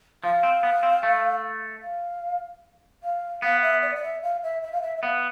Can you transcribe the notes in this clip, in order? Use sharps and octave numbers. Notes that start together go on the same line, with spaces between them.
F3 F5
C4
B3
C4
A3
F5
F5
B3 F5
E5
D5
D5
E5
F5
E5
E5
F5
E5
E5
B3 F5